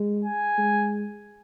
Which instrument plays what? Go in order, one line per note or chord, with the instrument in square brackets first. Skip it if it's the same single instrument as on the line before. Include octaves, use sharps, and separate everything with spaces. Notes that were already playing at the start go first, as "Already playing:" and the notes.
Already playing: [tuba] G#3
[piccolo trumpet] G#5
[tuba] G#3